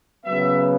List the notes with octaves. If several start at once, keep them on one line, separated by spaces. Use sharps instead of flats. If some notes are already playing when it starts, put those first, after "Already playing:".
C#3 F#3 B3 E5